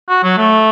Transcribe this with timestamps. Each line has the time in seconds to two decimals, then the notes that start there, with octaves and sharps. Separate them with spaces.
0.09 F#4
0.23 F#3
0.38 A3